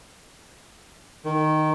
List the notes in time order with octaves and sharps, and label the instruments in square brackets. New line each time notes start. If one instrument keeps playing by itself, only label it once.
[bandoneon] D#3